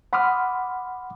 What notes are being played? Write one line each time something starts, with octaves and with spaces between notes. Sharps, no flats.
F#5 B5 C6 D6 D#6 F6